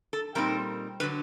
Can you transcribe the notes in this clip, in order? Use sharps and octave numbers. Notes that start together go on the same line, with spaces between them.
A4
A#2 G3 C4 D#4 A#4
D3 F#3 B4